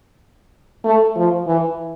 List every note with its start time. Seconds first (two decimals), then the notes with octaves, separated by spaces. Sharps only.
0.84 A3
1.16 F3
1.47 E3